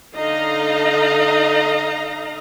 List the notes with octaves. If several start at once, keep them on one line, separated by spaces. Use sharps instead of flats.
D3 D#4 D#5 F5 A#5